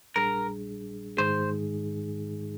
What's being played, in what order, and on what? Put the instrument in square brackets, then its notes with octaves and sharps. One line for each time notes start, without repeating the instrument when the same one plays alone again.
[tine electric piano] A#1 A#2 G3 D4 G#4 [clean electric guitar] A#4
[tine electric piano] G#2 D#3 G#3 D#4 G#4 [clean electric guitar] C5